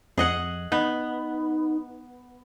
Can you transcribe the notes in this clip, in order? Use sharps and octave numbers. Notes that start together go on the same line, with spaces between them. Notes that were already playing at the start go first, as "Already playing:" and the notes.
F2 G#4 D#5 F#5
B3 D#4